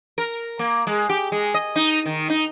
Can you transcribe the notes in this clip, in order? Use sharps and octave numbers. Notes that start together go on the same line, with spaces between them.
A#4
A#3
G#3
G4
G#3
D#5
D#4
D#3
D#4